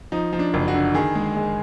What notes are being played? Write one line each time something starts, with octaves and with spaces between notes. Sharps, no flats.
F3 D#4
F3
D4
F#1
F#4
D3
D#3 G#4
G#3
G#3